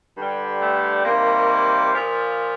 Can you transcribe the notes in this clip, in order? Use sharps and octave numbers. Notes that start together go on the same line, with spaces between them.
G2 D3 G3
A3
C3 D#3 G3 A#3
A#2 F3